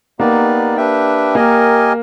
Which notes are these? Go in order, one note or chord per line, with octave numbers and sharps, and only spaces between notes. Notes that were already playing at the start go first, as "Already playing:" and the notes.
A#3 B3 D#4 G4 B4 D5
D4 G4 B4 E5 G5
A#3 G4 A#4 D#5 G#5